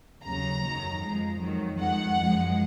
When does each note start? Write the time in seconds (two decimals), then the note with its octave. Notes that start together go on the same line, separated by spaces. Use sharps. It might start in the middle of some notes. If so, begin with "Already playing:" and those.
0.24 D#2 C#3 F#3 A#5
0.63 F#2 D#3 F#3
1.02 F2 F3 G#3
1.41 F2 D#3 F#3
1.80 F2 D#3 G#3 F#5
2.19 F#2 F3 G#3